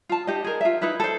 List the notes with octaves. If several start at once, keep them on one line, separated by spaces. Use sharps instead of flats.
F4 A5
D#4 G4 D#5
G#4 A#4
F4 E5
D#4 E4 B4 E5
A4 C5